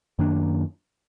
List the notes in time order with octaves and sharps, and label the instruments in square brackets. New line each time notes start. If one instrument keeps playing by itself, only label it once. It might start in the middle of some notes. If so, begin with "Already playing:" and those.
[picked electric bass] F#2 D#3 A#3 D4